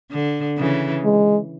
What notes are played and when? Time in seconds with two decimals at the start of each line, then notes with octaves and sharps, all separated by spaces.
0.12 D3
0.57 C#3 E3
1.04 G#3